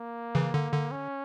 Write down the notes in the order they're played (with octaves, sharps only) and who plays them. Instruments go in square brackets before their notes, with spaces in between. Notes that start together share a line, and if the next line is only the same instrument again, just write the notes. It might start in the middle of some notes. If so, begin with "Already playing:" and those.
Already playing: [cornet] A#3
[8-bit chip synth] C#3 E3
D3
D3
[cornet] C#4